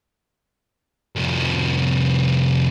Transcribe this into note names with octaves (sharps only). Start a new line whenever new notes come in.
C2 F2